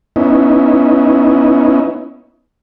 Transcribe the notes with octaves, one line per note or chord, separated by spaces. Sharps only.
B3 C#4 D#4 E4